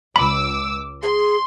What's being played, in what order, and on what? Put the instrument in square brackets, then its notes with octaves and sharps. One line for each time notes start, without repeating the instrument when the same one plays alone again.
[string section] C#2 D6 E6 [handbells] B5
[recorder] G#4 [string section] C6